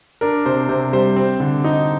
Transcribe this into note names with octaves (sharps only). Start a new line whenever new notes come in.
D4 A#4
C3 C5
C3 C5
G3 C5
C4
D3
D#4